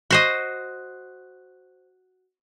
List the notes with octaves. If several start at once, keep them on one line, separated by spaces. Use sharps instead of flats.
F#4 C5 D#5